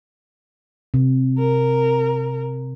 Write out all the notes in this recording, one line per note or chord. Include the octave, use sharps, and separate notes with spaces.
C3
A#4